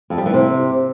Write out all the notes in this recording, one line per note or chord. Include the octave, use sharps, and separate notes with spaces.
F2
G3
E3
C3